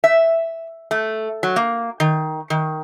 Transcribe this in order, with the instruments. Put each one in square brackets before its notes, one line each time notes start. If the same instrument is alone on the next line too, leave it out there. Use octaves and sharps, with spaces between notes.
[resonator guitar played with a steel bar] E5
A3
F#3
A#3
D#3
D#3